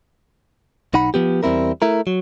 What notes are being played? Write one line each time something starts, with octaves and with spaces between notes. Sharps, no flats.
B1 D#4 F#5 B5
F3 B3 G4
E2 G3 C4 E4 A#4
A3 E4 A#4
F#3